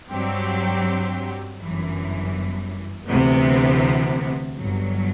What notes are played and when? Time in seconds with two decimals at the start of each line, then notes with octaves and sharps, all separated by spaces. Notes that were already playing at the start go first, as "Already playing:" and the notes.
0.12 G2 F#3 C4 G4
1.61 G1 F#2 E3
3.08 D2 C3 E3 B3
4.58 G1 G2 F#3